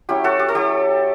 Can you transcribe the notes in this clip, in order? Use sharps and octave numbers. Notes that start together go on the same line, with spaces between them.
F#3 C#4 E4 G4
F#4 A4
G4
A4
F#3 C#4 E4 G4